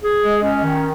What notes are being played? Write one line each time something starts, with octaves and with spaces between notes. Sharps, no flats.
G#4
G#3
C#4
D#3